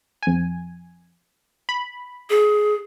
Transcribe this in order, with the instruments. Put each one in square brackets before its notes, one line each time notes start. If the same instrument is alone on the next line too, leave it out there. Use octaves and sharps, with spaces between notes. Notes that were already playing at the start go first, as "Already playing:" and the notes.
[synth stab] F2 G#5
B5
[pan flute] G#4